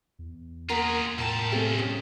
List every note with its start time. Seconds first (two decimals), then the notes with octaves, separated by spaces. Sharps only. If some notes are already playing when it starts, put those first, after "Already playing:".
0.19 E2
0.69 A#3 F4 G#4 A#4 F#5 A#5 B6
1.18 C2 A2 F4 A#4 G5 A5
1.52 A3 C4 G4 F5 G#5
1.79 C#4 D#5